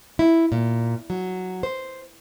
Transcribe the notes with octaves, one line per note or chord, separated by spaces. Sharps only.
E4
A#2
F#3
C5